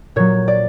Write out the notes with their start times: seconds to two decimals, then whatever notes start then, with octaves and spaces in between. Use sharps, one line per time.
0.16 A#2 F#3 C#5
0.48 D5